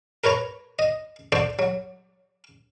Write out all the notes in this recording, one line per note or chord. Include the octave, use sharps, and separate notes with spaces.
A#4 B4 C#5 A#5
D#5
F#4 A4 C5 D5
F#3